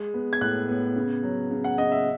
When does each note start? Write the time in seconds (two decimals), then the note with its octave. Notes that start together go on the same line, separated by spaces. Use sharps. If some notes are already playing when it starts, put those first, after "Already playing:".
Already playing: G#3
0.14 B3
0.33 G#6
0.41 A2 F#6
0.68 B3
0.96 C#3
1.23 F#3
1.51 C#3
1.64 F#5
1.78 C#3 D#5
1.92 E5